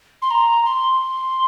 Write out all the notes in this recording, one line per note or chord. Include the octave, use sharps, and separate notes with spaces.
C6
A#5
C6